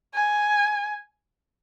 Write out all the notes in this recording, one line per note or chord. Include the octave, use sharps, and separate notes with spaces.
G#5